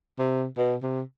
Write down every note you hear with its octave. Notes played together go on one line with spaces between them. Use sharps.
C3
B2
C3